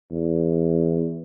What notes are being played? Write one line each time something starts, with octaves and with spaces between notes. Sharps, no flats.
E2